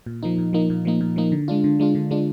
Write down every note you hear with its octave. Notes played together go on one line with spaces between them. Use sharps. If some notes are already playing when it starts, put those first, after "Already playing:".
A#2
F3 A#3 D#4
A#2
F3 A#3 D#4
A#2
F3 A#3 D#4
A#2
F3 A#3 D#4
D3
G#3 D4 F4
D3
G#3 D4 F4
D3
G#3 D4 F4